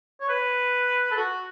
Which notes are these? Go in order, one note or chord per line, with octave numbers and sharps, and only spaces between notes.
C#5
B4
A4
F#4